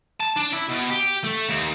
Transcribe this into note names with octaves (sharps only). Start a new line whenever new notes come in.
A5
D4
E4
B2
G4
A3
D#2